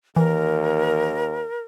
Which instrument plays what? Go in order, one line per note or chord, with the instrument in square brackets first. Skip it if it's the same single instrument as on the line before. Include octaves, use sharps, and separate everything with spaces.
[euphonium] D#2 [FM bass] E3 [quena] A#4